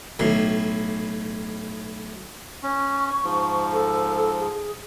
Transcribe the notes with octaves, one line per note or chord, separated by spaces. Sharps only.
B1 A2
C#4 C#6
G#2 F3
A4
A4
G#4